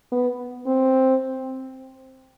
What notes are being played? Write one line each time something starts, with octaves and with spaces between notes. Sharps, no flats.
B3
C4